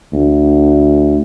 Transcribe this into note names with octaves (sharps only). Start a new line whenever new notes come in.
D2